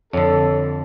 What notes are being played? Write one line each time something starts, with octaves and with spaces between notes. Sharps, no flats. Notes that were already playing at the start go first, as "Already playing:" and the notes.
F2 D3 A4 C#5